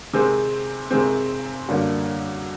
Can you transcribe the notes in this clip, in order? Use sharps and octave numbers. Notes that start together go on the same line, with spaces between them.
C3 D#3 G#3 C4
C3 D#3 G#3 C4
F#2 D3 G3 A#3